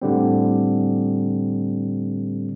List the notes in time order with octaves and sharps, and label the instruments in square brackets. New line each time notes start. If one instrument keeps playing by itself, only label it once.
[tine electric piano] A2 D3 G3 C4